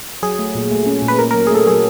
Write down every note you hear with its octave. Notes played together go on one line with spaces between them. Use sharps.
F#3 G#4
A3
A#2
A3
C#4
A#2
B4
A#2 A#4
A#4
F#3
G#4
A3 A4
F#3 G#4